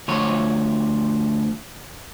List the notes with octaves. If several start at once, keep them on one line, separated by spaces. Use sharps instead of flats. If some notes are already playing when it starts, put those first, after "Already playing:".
D2 F3 C#5